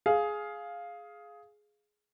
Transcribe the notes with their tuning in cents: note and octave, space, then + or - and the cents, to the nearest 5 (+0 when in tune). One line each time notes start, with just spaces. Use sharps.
G#4 +10 F5 +0